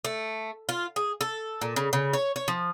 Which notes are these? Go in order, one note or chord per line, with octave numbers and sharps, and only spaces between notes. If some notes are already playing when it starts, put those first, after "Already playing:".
A3
F4
G#4
A4
A#2
C#3
C#3
C#5
C#5
F3